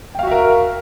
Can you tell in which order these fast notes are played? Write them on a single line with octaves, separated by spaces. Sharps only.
G5 F5 F#4 E5 A#4